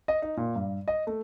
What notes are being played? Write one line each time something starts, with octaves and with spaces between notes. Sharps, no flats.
D#5
D#4
A#2
G2
D#5
A3